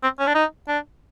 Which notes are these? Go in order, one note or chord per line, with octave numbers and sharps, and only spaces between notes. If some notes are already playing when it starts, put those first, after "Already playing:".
C4
C#4
D4
D#4
D4